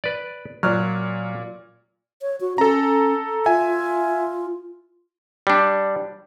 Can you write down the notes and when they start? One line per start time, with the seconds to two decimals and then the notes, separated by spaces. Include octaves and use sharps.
0.04 B4 D5
0.63 A#2 F#3 D5 F6
2.22 C#5
2.41 F#4
2.58 C#4 A4 A#5
3.46 F4 E5 G#5
5.47 G3 D4